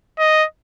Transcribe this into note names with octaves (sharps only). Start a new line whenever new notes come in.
D#5